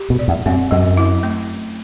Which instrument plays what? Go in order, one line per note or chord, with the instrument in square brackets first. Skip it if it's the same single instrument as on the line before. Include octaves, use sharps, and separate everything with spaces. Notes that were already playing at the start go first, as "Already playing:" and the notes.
Already playing: [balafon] G4
[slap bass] B2
[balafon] D5
[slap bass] E2
[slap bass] F#2 [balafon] C4
[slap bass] F#2 [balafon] F#3
[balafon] E4
A3